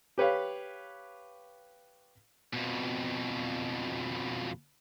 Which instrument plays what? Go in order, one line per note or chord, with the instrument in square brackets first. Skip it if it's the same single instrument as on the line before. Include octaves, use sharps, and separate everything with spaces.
[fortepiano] G4 B4 C#5 F5
[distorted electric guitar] F2 B2